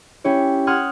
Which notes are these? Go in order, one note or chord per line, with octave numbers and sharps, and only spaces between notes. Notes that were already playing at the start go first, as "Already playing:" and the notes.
C#4 E4 G4 C#5
F#5 C6 D#6 F6 F#6 G#6